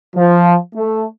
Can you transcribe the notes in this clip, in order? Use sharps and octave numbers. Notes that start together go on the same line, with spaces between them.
F3
A3